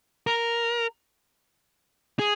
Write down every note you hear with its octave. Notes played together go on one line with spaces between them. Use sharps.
A#4
G#4